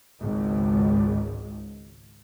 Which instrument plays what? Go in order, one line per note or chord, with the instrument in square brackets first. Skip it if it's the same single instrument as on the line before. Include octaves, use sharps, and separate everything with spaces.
[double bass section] G#1 C#2 G#2